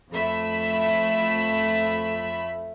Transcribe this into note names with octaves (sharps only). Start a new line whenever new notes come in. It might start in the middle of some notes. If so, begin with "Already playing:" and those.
F2 A3 E5 B5